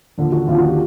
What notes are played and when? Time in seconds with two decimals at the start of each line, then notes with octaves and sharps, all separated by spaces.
0.18 D#2 D3 F3
0.32 F#4
0.47 D#2 D3 F3 F4
0.58 F#4
0.68 G4